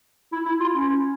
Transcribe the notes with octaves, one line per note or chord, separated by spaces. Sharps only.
E4
E4
F4
C#4